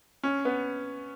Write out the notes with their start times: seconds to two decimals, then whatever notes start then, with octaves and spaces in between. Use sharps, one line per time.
0.24 C#4
0.45 B3